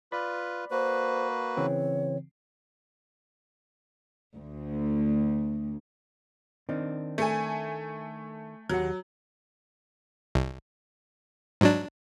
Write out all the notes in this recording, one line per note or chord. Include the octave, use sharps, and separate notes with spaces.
F4 B4 D5 B5
A#3 F#4 B4 C5
C#3 E3 C4 C#5
D2
D#3 C4 D4
A3 G#5
D#2 F#3 G4 F#5
C2
G#2 F#3 D4